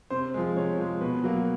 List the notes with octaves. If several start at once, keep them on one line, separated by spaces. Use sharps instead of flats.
C3 C5
F3 G#3
C3 C#5
F3 G#3
B2 B4
F#3 A#3